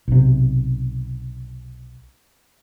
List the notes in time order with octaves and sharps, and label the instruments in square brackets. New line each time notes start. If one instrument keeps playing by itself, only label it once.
[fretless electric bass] B1 C3